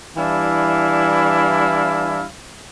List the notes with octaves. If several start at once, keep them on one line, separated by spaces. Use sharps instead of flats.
E3 G3 D4 E4 F5